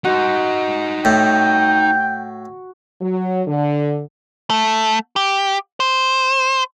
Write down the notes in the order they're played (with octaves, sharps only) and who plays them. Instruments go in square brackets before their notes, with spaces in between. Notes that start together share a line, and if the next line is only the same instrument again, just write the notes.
[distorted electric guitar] D#4 C5 [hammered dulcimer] F#4
[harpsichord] A2 [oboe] G5
[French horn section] F#3
D3
[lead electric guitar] A3
G4
C5